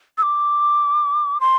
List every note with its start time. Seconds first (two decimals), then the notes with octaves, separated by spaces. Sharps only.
0.18 E6
0.23 D6
1.40 C6